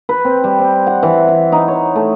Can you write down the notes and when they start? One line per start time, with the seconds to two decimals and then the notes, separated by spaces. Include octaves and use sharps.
0.09 B4
0.25 C4
0.44 G3
0.59 C4
0.87 F#5
1.03 E3
1.28 E5
1.52 D#4
1.68 C#5
1.96 A3